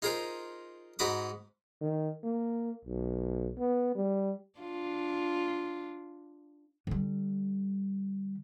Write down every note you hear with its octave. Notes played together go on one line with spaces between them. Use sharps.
D#4 F4 G#4 A#4 C5
G#2 D#4 F#4 B5 D6 D#6
D#3
A#3
B1
B3
G3
D4 F4
D3 G3